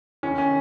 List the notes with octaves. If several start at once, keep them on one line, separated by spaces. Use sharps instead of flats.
D#2 D#3 C#4
C#4